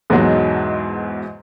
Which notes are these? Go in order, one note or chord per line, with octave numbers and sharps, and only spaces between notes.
E2 G#2 B2 F#3 G#3